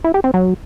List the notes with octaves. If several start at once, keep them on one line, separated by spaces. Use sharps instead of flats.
E4
G4
C4
F#3